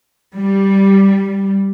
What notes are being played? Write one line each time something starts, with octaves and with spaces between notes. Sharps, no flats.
G3